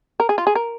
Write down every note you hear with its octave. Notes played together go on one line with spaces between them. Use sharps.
A#4
G#4
F4
G#4
A#4